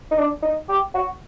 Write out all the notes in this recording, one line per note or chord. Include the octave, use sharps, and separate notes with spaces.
D#4
D4
D#4
G4
F#4